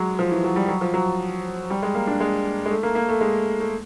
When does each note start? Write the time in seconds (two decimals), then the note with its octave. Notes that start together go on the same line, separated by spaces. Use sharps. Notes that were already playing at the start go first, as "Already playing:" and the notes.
Already playing: F#3 G#3
0.19 F3
0.31 E3
0.44 F#3
0.56 G3
0.69 F#3
0.81 F3
0.94 F#3
1.70 G3
1.83 G#3
1.95 A#3
2.07 D4
2.20 G#3
2.66 G#3
2.71 A3
2.83 A#3
2.95 A#3
3.09 A3
3.21 G#3
3.60 A3